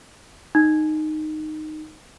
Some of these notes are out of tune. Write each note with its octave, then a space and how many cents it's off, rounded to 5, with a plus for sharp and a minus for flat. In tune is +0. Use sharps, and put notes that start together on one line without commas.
D#4 -10